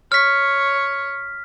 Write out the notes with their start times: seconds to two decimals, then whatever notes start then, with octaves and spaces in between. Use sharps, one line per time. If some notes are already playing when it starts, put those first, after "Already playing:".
0.12 C#5 F6 B6